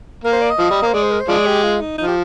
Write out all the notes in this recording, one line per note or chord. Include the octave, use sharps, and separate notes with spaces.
A#3 A#4
C5
D5
D#5
F3
G3
A#3
C5
G#3 D5
C5
A#4
C5
F3 G#3 D5
G4
F4
D#4
F3 D#4
G4